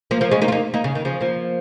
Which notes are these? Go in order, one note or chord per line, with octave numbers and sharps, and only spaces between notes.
F3 A#3
F3 A#3
G#3 C#4
A#3 D#4
F4
A#3 D#4
A#3 D#4
C#3
D#3
C#3 F3
F3 A#3